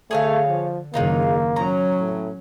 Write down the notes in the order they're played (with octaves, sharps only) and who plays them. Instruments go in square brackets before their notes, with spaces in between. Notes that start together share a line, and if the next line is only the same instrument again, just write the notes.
[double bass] D3 [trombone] A3 [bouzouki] G#4 C#5 F5
[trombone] F3
[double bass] F#1 D#3 [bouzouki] G#3 D#4 F4 [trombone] A#3
[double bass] F#3 C#4 [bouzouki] A#5
[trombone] A2